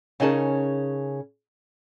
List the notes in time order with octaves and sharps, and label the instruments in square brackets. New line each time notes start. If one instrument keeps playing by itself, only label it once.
[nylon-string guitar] C#3 C#4 D#4 G#4 A#4 A5